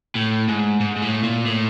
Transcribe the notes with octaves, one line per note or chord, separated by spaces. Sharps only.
A2
G#2
G#2
G#2
A2
A#2
A2